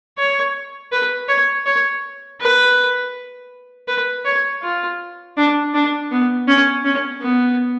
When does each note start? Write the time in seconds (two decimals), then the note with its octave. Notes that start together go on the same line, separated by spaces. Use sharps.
0.18 C#5
0.92 B4
1.28 C#5
1.66 C#5
2.41 B4
3.88 B4
4.25 C#5
4.62 F4
5.37 D4
5.74 D4
6.11 B3
6.48 C#4
6.85 C#4
7.22 B3